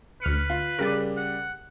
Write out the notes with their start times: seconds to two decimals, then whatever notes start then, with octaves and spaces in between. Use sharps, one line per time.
0.22 D2 B4 F6 C#7
0.50 F4
0.79 C#3 G3 A#4 D5
1.17 F#5